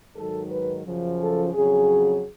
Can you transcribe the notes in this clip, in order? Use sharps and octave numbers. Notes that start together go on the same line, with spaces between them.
G#2 D#3 F#3 A4
B4
F#2 C#3 F3
A4
F2 C#3 F#3 G#4